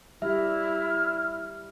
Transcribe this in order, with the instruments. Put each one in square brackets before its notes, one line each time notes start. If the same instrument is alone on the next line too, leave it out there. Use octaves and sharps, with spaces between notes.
[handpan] G3 G4 [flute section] E4 F6 [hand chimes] E5